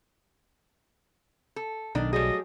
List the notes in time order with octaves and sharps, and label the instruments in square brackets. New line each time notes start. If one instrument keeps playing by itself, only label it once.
[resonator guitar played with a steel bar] A4
[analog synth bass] B1 [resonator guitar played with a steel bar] D#3 D4
[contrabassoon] F#3 [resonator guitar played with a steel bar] G3 A3 G#4 [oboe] D#5